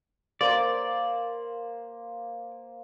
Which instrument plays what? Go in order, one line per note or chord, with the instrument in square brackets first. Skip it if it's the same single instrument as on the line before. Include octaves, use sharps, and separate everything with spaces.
[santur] A#3 C5 [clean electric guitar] D5